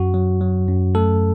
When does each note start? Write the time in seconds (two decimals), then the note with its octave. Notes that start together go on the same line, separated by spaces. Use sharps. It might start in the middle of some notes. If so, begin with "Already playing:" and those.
Already playing: F#2 F#4
0.14 F#3
0.41 F#3
0.68 F#2
0.95 A3 A4